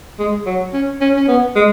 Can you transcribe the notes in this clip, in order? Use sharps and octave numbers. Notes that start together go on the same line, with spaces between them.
G#3
F#3
C#4
C#4
C#4
B3
G#3